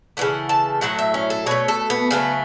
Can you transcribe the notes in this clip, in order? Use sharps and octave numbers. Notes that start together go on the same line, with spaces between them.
C#3 E3 A3 F#5
A5
A2 F#3 A3 F#5
E5
C#4
A4
B2 A3 C#5
A4
B3
C#3 F#3 A3 B3